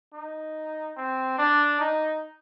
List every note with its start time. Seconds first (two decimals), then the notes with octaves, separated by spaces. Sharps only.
0.14 D#4
0.97 C4
1.38 D4
1.80 D#4